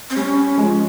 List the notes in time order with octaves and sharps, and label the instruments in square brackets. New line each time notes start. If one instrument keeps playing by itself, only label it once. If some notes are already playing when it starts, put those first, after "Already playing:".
[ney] C4
[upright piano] G3 [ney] C#4
[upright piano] F3 G#3